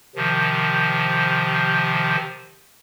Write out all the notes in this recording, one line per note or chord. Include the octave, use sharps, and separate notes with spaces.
C3 D#3 F3